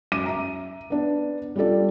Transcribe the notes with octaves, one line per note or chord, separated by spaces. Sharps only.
F#2 D6 D#7
E5 A#5
B3 D4
G3 C#4 F4 A4 D5